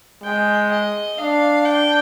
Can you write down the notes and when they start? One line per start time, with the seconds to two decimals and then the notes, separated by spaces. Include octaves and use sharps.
0.24 G#3 G5
0.71 D#5
1.18 D4 F5
1.65 G5